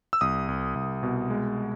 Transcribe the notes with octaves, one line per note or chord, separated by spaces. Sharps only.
E6
C2 D#6
C2
C2
B2
G#3